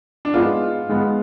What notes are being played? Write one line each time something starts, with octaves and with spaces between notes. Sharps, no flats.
D4
G#2 G#3 B3 F4
G#2 G#3 B3